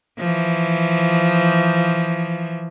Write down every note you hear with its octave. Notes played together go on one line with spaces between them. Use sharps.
E3 F3